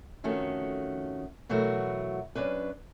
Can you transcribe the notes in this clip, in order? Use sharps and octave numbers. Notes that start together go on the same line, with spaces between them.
F2 D#3 A3 C#4 F#4
B2 E3 F#3 A3 F#4 A#4
F#2 A#3 C#4 D4 B4